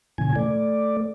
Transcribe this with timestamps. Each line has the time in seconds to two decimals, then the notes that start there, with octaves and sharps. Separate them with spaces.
0.18 A#2 C#3 E3 G#5
0.36 A3 D5